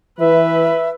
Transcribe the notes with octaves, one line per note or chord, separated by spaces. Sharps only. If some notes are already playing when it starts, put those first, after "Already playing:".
E3 B4 E5